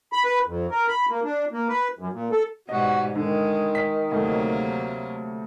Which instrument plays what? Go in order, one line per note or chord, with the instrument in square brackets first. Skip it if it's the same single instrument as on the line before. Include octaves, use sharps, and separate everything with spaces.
[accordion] B5
B4
F2
A#4
B5
A#3
D4
A#3
B4
F#2
A#2
A4
[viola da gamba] G#2 B2 G3 [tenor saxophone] F#4 [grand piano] D#5
[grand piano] D3 [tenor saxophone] D#3 [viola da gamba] G#3
[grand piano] B6
[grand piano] D2 A3 [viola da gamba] C3 F#3 A#3